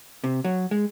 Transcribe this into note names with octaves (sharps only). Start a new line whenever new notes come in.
C3
F#3
G#3